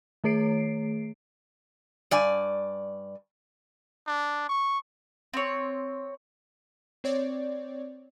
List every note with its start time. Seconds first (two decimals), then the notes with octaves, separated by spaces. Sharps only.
0.24 D#3 A3 G#4 C#5 C7 D7
2.11 G2 D5 G#5
4.07 D4
4.49 C#6
5.34 C4 C#5
7.04 C4 C#5 D5